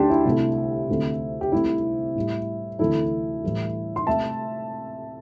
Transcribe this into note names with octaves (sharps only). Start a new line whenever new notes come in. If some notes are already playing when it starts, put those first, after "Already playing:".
Already playing: D2 D3 A3 D4 G4 G5 A5 C6
E4
C2 C3 A3
D2 C3 A3
G4
C2 C3 A3 E4
A2 G3
D2 C3 E3 A3 E4 A4
A2 E3 G3
C6
C3 A3 E5 A5